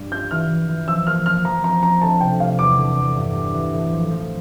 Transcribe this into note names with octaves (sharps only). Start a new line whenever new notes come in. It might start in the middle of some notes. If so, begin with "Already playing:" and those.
Already playing: G2 G3
F4 G6
E3 F6
E3
E3
F3 E6
A#3 F6
A#3 F6
F3 A#5
C4 A#5
C4 A#5
D2 A5
C3 G5
G3 F5
E2 D6
D3
E2
G2
G3
E3
A2
F3
F3